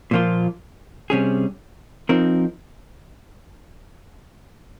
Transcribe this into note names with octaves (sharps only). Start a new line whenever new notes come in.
A#2 F3 A#3 F4
C3 G3 C#4 G#4
F3 C4 D#4 A#4